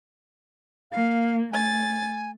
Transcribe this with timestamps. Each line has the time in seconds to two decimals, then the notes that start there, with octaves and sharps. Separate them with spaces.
0.92 A#3 F5
1.52 A3 G#5 A6